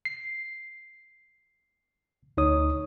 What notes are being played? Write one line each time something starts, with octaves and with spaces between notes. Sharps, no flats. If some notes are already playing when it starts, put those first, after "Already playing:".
C7
D2 D#4 C#5 D#6